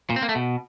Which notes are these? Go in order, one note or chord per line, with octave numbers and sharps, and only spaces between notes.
A#2
C4
A#3
A3
B2